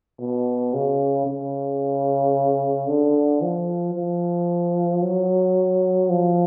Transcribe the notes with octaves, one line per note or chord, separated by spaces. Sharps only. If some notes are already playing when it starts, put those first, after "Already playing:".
B2
C#3
C#3
D3
F3
F3
F#3
F3